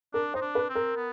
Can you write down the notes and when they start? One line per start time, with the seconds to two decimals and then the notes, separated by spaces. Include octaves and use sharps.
0.14 D4 A#4
0.34 D#4 C5
0.41 D4
0.55 B4
0.69 C4
0.75 A#4
0.96 B3